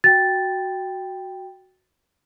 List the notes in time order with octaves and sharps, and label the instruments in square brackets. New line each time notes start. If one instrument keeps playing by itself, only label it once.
[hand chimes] F#4 G5 [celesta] A6